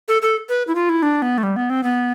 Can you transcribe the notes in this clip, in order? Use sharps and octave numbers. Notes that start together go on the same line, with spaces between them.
A4
A4
B4
E4
F4
E4
D4
B3
A3
G3
B3
C4
B3